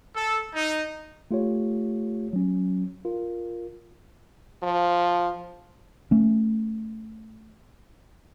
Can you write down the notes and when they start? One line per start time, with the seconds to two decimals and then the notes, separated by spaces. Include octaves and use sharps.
0.15 A4
0.53 D#4
1.31 A3 F4 G4 C#5
2.33 F#3 C#4
3.05 F4 A#4
4.63 F3
6.11 A3 C#4